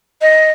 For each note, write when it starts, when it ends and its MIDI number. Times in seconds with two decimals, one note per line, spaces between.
0.22 0.52 75